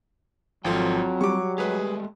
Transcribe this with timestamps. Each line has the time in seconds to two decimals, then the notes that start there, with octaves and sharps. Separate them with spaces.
0.65 G#1 F3 F#3 C4 F4 A4 G5
1.21 G3 C#6 D6
1.58 G#3 A3 G4 G#4 B4